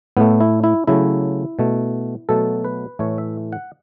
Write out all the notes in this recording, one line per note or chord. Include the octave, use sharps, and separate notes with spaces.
A2 A3 B3
E4
E4
C#3 F#3 A3 E4
B2 A3
B2 F#3 A3 A4
B4
A2 E3 A3 C#5
E5
F#5